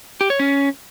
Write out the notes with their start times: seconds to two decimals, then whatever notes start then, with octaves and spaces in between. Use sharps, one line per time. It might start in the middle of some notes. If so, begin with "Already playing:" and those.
0.21 G4
0.30 C#5
0.40 C#4